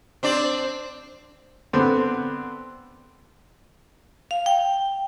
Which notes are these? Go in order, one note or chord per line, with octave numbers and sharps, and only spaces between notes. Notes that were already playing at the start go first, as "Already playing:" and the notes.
C4 D4 D5
D3 B3 C4
F5
G5